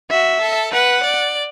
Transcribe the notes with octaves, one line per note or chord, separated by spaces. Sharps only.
F#4 E5
A4
B4 F#5
D5